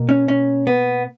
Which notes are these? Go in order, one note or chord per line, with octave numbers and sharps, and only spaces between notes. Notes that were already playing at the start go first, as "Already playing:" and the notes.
Already playing: B2 A#3
C#4
C#4
B3